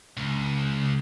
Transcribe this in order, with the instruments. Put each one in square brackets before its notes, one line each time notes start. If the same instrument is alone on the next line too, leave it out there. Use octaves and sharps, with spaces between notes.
[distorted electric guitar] C#2